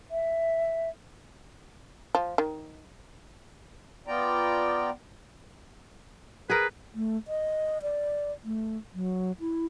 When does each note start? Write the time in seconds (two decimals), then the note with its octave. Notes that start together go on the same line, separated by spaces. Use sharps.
0.11 E5
2.15 F3
2.38 D#3
4.07 B3 F4 D5 G5 A#5
6.50 G#4 A#4 B4
6.95 A3
7.28 D#5
7.82 D5
8.44 A3
8.94 F#3
9.40 E4